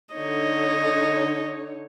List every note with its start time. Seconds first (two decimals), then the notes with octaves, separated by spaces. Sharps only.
0.14 D3 D#4 C#5 D#5